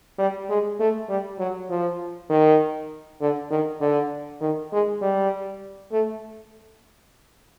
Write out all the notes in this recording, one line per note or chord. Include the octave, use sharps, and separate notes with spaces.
G3
G#3
A3
G3
F#3
F3
D#3
D3
D#3
D3
D#3
G#3
G3
A3